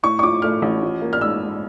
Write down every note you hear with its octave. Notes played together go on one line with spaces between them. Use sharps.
A2 C#6
C#6
F3 D6
A3 F6
A1
F3
A#3
F6
G#2 E6
G#2